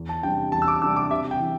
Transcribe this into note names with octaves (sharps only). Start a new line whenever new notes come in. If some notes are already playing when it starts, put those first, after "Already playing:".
Already playing: E2
A5
C3 G3 D4 G5
E2 A5
E6
D6
C3 G3 D4 E6
D6
C3 E5
G5
E3